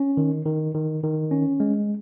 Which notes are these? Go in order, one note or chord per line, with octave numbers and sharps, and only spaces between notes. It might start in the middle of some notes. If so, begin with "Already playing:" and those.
Already playing: C#4
D#3
D#3
D#3
D#3
C#4
G#3